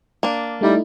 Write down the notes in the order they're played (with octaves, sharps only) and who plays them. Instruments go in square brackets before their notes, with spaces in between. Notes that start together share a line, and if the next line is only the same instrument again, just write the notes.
[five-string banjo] A#3 D4
[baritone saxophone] G3 [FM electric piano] A3 D#4 E4